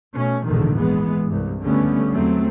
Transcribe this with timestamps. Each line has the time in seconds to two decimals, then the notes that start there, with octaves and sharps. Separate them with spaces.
0.14 B2 A3 C#4
0.46 A#1 E2 G#2 B2 D3 D#3
0.78 E3 G#3 B3
1.26 C2 G2
1.61 C#2 D3 G3 A3 B3 C#4
2.11 E2 F#3 A3 C4